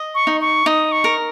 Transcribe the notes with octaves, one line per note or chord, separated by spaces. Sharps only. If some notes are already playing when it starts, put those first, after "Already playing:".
Already playing: D#5
C#6
D#4
C#6
D#4 D#6
C#6
A#4